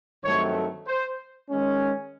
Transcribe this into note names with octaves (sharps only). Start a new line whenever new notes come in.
G2 D#3 F#3 A3 C4 C#5
C5
D#3 G#3 C#4